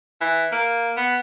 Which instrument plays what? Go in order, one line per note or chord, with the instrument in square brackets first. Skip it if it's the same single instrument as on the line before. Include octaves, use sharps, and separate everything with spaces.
[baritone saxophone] E3
A#3
B3